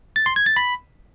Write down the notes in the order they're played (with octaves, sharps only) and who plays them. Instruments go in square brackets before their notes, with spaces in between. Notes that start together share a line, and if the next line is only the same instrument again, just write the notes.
[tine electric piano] A6
C6
G#6
A6
B5